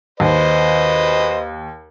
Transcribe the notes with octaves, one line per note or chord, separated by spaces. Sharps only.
D#2 B4 C5 D#5